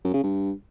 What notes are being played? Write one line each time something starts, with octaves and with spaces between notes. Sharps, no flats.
F#2
C#3
G2